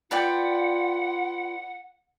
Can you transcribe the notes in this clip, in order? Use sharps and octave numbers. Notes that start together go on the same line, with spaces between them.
F4 B4 D5 F#5 G5